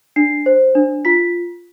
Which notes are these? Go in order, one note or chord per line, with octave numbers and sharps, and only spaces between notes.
D4 C7
C5
D4
F4 B6